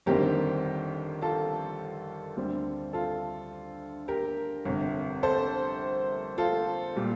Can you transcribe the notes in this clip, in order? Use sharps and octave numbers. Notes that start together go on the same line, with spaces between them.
G1 F2 D#3 G3 C4 G4 A#4
F4 A4
D2 D3 G3 C4
F4 A4
G4 A#4
G1 F2 C3
A4 C5
F4 A4
A#2 G3